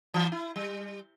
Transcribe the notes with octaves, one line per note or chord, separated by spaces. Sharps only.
E3
E4
G3